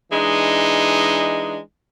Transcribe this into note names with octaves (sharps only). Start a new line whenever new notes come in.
E3 G#3 D4 D#4